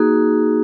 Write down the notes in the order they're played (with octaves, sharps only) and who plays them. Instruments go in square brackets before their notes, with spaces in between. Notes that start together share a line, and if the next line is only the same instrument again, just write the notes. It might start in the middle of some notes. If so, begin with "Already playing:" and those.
Already playing: [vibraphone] A#3 D#4 F#4 G#4